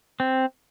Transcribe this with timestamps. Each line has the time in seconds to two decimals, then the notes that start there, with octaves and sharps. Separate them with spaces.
0.20 C4